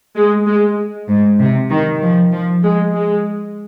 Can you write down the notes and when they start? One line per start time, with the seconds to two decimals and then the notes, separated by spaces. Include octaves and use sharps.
0.16 G#3
0.47 G#3
1.09 G#2
1.39 C3
1.70 D#3
2.01 F3
2.32 F3
2.63 G#3
2.94 G#3